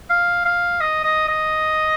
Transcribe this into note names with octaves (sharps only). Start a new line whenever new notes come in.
F5
F5
D#5
D#5
D#5